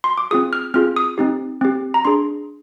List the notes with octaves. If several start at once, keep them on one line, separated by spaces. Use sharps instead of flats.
C6
D6
C4 F4 G#4 D#6
F6
C4 F4 G#4 F6
D#6
C4 D#4 G4
C4 G4
A#5
D4 G#4 C6